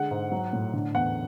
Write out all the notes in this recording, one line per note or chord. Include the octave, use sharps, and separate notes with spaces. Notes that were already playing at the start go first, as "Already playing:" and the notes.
Already playing: D3 G#3 F#5
G#2
F#3
A2
D3
E2 F#5